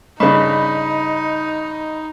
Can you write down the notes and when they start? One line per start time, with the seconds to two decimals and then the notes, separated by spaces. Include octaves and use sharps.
0.20 G2 C#3 D#4 D#5 B5